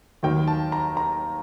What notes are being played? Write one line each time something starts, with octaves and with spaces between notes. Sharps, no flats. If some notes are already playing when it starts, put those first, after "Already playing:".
D#2 D#3 F#3 G5
A5
A#5
A#5